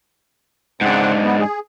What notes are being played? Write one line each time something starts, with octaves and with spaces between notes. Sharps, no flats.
G#2 C#3 C4 D4 F#5
B3
G#4